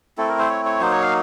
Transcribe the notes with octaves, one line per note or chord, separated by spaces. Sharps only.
A3 C4 E4 A4
A#4
C5
C#5
C#5
F#3 A#3 D#4 C5
C#5
F5